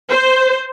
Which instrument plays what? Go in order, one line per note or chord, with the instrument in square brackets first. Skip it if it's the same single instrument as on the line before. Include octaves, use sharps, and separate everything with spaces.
[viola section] C5